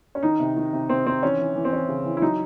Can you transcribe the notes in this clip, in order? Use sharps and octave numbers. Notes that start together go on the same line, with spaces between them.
C#4
D#3 D#4
C3
D#3
C3
C3 C4
D#3 C4
E3 C#4
E3
E3
C4
E3 C#4
C#3
E3
E4
F#3 D#4